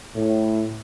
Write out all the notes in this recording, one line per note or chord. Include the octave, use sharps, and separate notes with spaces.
A2